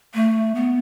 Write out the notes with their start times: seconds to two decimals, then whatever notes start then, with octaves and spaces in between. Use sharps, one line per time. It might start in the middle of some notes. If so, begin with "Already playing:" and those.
0.14 A3
0.55 B3